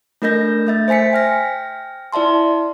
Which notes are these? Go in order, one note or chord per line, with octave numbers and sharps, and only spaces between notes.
A3 D4 A#4 D#5 G6 A#6
A3 E5 A6
C5 E5 G#5 B6 C#7
G5 F6 A#6
E4 D5 E5 A5 C6